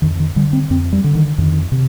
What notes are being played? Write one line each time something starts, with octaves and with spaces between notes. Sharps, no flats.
F2 D#3
D#3
D3 G3
C4
F2 C4
G3
D3
D#3
F2 D#3
C3